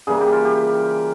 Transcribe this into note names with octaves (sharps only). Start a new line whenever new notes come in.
C#3 E3 G3 A#3 G#4
G4
F4
G4